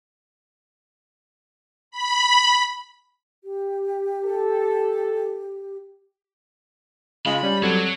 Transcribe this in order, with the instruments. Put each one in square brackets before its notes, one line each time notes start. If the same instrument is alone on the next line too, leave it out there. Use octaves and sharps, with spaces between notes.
[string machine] B5
[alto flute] G4
[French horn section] A4
[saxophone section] C#3 G#3 [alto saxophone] F4 [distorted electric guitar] B5
[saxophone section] G3 [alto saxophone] C#4
[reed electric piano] F#3 C4 G#6 [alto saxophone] A4 [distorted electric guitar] C#5 F#5